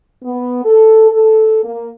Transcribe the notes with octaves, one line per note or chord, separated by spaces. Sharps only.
B3
A4
A4
A#3